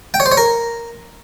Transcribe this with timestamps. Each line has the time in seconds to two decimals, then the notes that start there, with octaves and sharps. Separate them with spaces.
0.14 G5
0.20 C#5
0.26 C5
0.32 C#5
0.37 A#4